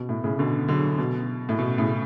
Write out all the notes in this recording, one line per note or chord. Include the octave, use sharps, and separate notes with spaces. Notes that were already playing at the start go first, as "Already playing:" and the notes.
Already playing: B2
A2
A2 C#3
B2 D3
D3 F#3
B2
A2
B2
A2 C#3